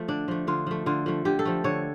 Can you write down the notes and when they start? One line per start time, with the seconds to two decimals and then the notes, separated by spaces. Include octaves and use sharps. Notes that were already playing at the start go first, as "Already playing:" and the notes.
Already playing: F3 A3
0.08 D3 D4
0.28 F3 A3
0.47 D3 F4
0.66 F3 A3
0.86 D3 F4
1.06 F3 A3
1.25 D3 G4
1.39 A4
1.45 F3 A3
1.64 D3 C#5